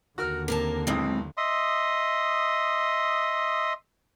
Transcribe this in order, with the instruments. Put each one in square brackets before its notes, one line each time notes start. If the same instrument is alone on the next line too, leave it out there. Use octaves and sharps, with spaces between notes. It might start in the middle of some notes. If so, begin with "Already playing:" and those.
[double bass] D#2 D3 [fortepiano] F#4 A#4 F6
[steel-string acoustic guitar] C3 A#4 A5 [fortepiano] A#3
[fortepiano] B1 A2 D#6 [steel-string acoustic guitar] G#3 C4
[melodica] D#5 E5 C6 D#6